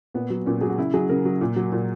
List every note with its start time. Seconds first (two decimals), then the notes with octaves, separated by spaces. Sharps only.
0.14 A#2 B3
0.30 F#3
0.46 A#2 C#4
0.61 F#3 G#4
0.69 F#4
0.78 C#3 E4
0.94 F#3 G#4
1.10 C#3 A#4
1.25 F#3
1.41 A#2 A#4
1.56 F#3
1.72 A#2